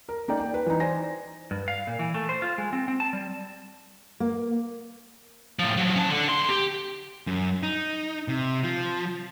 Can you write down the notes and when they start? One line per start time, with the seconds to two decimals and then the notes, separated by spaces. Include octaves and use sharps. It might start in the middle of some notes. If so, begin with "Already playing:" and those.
0.09 A#4
0.28 A#3 D#4 D5 G5
0.40 G5
0.54 B4
0.66 E3 D#4
0.80 C5 D5 G#5 A#6
1.51 G2
1.68 F5
1.87 A#2
1.99 E3
2.14 A3
2.29 C5
2.42 F4
2.58 G#3
2.73 C4
2.88 C4
3.00 A5
3.13 G3
4.20 A#3
5.59 A2 F3
5.77 F3 F#3
5.96 C#4 A5
6.09 D3
6.29 D2 C6
6.49 G4
7.27 F#2
7.63 D#4
8.28 C3
8.64 F3